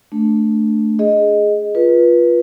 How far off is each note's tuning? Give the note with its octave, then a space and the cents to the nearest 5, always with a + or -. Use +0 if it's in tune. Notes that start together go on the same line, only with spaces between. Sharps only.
A3 +0 D4 +0
G#4 +0 D#5 +0
F4 +0 B4 -25